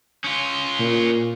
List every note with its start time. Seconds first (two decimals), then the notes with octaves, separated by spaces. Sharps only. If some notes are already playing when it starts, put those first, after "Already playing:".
0.24 C#4 F4
0.79 A#2